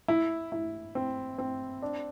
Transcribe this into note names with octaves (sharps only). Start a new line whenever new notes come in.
E4
E4
C4
C4
D4